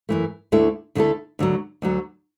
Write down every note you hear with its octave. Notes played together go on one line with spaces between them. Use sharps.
F#2 E3 A3
D2 D3 A3 E4 A4
D2 D3 A3 E4 A4
D2 D3 F#3
D2 D3 F#3